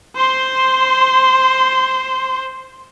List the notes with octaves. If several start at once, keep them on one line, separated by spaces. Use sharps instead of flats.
C5 C6